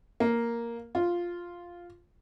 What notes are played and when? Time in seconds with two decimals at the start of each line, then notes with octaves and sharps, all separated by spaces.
0.20 A#3
0.95 F4